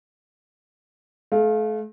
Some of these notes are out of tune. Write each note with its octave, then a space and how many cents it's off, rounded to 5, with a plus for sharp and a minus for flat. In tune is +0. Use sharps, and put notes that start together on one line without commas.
A3 -35 F5 +0